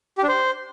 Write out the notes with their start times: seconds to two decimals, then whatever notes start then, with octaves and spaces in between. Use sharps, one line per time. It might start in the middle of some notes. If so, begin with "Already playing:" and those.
0.18 G4
0.23 D4
0.28 C5